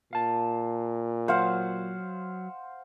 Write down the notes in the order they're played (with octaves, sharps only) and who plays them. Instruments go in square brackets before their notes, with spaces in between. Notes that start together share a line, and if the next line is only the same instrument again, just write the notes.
[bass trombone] A#2 [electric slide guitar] F5 A5
[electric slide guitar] F#3 [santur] C5 F5 F#5